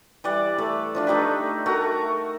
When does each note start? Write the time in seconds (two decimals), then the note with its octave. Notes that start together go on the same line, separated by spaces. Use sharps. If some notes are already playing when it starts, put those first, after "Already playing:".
0.24 E3 G3 D5 F#5
0.58 A3 A4 E5
0.95 F3 D4 D5
1.07 A3 D#4 G4 B4
1.66 A3 F#4 A#4 A#5